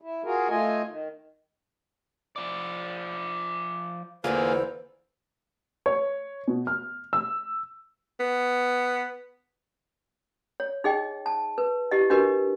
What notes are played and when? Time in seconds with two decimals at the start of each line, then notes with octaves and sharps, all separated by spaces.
0.01 E4
0.24 F4 F#4 G#4 A#4
0.48 A3 F4 D#5 G#5
0.88 D#3
2.36 F3 D5
4.24 E2 D3 E3 A#3 F4 G#4 C5
5.86 C#5
6.48 B2
6.67 F6
7.13 E6
8.20 B3
10.60 C#5
10.84 D#4 G#4 D#5 G5
11.26 A5
11.58 B4
11.91 E4 G4 D#5
12.10 D4 F#4 G4 A#4 B4 D#5